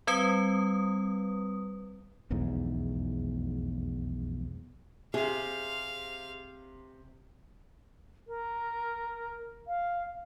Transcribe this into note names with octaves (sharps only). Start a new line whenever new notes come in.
G3 C4 B4 D#6
F1 B1 E2 G#2
C3 G#4 F5
A#4
F5